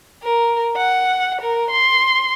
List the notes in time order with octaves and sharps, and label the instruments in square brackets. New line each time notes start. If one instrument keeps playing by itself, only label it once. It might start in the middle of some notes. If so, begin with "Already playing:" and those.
[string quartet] A#4
F#5
A#4
C6